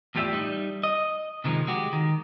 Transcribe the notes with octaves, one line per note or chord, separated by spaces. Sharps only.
E2 A2 F4 G4 D5 E5
G3 D#4
D#5
C3 D#3 F3 G#3 D#4
G#3 F#4 G4
D#3